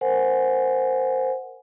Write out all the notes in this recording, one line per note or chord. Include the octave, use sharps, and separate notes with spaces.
A#4 C5 F#5 G#5